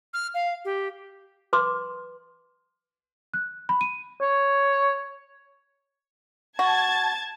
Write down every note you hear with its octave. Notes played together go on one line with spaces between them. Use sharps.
F6
F5
G4
B4 C6 D6
F#6
B5
D#7
C#5
F#4 A5 G#6 A6